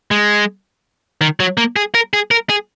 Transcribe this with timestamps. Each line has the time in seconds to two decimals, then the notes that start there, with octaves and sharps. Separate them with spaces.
0.11 G#3
1.21 D#3
1.40 F#3
1.57 A#3
1.76 G#4
1.95 A#4
2.13 G#4
2.31 A#4
2.50 G#4